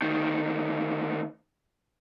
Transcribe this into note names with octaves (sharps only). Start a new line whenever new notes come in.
D2 D#3